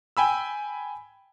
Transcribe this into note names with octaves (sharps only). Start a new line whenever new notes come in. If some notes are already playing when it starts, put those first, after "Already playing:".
G5 G#5 B5 E6